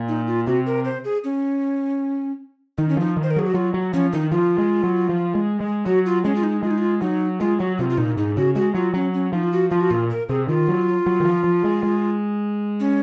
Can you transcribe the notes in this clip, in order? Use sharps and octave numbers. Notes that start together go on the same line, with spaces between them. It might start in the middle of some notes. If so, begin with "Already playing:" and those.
Already playing: A#2
D#4
F4
C3 F#4
A#4
C5
G#4
C#4
D#3 D#4
C#4
F3 D#4
D#3
C5
A#4
F#3 G#4
F#4
F#3 F4
F#3
F3 C#4
D#3 D#4
F3 F4
G#3
F#3
F3
G#3
G#3
F#3 F#4
F4
G#3 C#4
F4
D#4
G#3 F4
D#4
F4
F#3 D#4
G#3 F4
F#3 F#4
C3 F4
F4
A#2 D#4
G#2 D#4
C#3 F#4
G#3 F#4
F#3 F4
F#3 C#4
C#4
F3 D#4
F4
F#4
F3 F4
F#4
A#2 F4
A#4
C3 G#4
D#3 F4
F#3
F#3
D#3
F3
F3
G#3
G#3
C#4